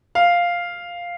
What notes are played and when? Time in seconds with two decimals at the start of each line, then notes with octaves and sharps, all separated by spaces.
0.15 F5